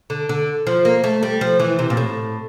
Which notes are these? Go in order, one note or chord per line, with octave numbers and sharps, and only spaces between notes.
D3
D3
F3
A#3
A3
G3
F3
E3
C3
A#2
A2